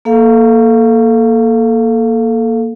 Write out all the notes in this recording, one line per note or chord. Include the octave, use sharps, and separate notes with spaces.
A#3 A4 F5